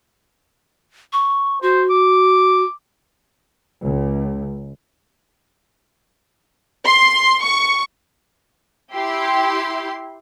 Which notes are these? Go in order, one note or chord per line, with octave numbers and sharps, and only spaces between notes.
C#6
F#4 C5
D6
C#2
C6
C#6
E4 G4 C6